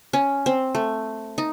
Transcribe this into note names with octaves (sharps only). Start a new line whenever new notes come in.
C#4
C4
A3
D#4